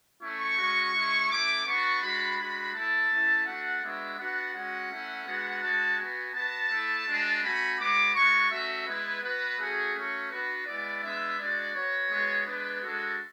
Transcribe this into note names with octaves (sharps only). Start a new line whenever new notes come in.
A3 C#4 E4 C#6
G#3 C#4 F#4
G#3 C#4 E4
A3 C#4 E4 D6
B3 D4 F#4 C#6
G#3 D4 F#4 B5
G#3 D4 F#4 B5
A3 E4 A5
A3 C#4 E4
A3 D4 F#4 F#5
G#3 B3 D4 F#4 E5
B3 D4 F#4 F#5
G#3 C#4 F#4 F#5
A3 C#4 E4
G#3 B3 D4 F#4
G#3 D4 F#4 A5
B3 F#4 G#5
B3 F#4 A5
A3 E4
G#3 D4 F#4
A3 C#4 F#4 B5
G#3 B3 F#4 D6
G#3 D4 F#4 C#6
A3 C#4 F#4 E5
G#3 B3 E4 B4
B3 F#4 B4
A3 C#4 F#4 G#4
A3 C#4 F#4
B3 D4 F#4 B4
G#3 B3 E4 D5
G#3 B3 D4 E5
G#3 D4 F#4 D5
B3 F#4 C#5
G#3 B3 F#4
G#3 B3 D4 B4
G#3 D4 F#4 A4